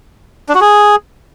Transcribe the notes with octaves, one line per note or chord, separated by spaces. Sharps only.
D4
F#4
G#4